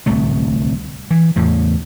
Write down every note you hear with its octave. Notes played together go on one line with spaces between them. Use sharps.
D1 C2 A3
E3
E2 A2 C#3